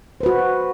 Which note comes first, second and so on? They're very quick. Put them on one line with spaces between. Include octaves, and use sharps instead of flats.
C5 B4 F#4